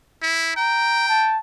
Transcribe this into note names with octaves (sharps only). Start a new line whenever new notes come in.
E4
G5 A#5
A5